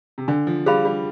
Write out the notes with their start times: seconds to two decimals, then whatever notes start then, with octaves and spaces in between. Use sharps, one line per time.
0.18 C3
0.28 D3 D4
0.47 F3
0.66 G3 G#4 C5 F5 B5
0.85 G3